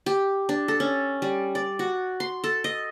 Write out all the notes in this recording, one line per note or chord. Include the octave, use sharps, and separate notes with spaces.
G4
D4
A4
C#4
G3
D5
F#4
C6
A4
D#5